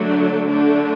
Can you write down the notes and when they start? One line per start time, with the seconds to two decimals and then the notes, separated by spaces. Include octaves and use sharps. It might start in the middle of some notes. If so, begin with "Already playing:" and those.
Already playing: D3 F#3 A3 D4
0.47 D3 A3 D4